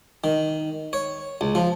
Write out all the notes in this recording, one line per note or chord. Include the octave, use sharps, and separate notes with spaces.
D#3
C#5
C#2
F3